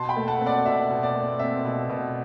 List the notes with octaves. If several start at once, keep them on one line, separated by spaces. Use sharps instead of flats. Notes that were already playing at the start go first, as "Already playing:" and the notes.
Already playing: B2 A5 C6
G5 B5
A3
F#5 A5
C4
D5 F#5
B2 E5
B2
D5
A3
C4 E5
B2
B2